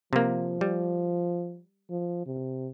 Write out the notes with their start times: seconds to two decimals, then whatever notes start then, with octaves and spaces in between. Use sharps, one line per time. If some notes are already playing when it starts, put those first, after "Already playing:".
0.13 C3 F3 A#3
0.61 G3
1.90 F3
2.26 C3